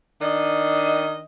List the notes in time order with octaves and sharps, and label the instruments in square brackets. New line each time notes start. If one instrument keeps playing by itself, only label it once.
[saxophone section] D#3 D4 D#5